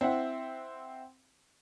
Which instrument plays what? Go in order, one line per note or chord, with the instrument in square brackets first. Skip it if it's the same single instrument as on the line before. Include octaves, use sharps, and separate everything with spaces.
[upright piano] C4 E4 F#5